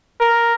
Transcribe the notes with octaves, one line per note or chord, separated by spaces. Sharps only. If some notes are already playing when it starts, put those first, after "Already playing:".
A#4